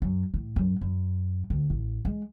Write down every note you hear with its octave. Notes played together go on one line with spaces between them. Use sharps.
F#2
A2
F#2
F#2
D2
A1
G#3